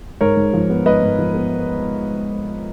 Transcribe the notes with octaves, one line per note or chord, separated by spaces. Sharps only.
G#2 A#4 C#5
G#2
F3
B3
G#2 B4 D#5
G#2
F3
B3